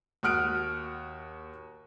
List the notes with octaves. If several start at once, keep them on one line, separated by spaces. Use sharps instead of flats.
D#2 F#4 D#6 F6 F#6 D7